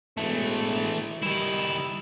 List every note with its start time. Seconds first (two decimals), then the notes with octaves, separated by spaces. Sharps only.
0.18 E1 E3 A3
1.23 D#3 G3 E4